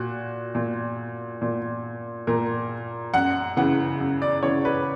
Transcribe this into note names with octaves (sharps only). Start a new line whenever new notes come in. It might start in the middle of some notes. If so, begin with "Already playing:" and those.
Already playing: A#2 F#4
A#2
A#2
A#2 A#4
F#2 F#5
C#3 E3 F#5
F#2
D5
C#3 E3 C#5
B4